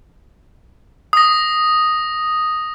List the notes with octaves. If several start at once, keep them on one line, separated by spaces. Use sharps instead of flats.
D#6 A#6